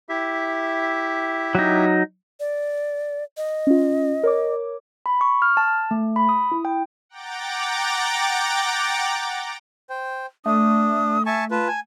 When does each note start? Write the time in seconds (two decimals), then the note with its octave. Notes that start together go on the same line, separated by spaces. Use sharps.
0.09 E4 G4 E5
1.55 F#3 D#4
2.40 D5
3.37 D#5
3.67 C#4 F4
4.23 A#4 C#5 D6
5.06 B5
5.21 C#6
5.42 F6
5.57 A5
5.91 A3
6.16 B5
6.29 D#6
6.52 E4
6.65 G5
7.09 F#5 G5 A#5 D6 A6
9.90 C5 G5
10.46 A3 D4 D#6
11.26 E5 G#5 A5 C#6
11.51 F4 B4 A5
11.68 G#5